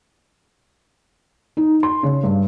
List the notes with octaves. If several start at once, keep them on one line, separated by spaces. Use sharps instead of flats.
D#4
C6
C#3
G2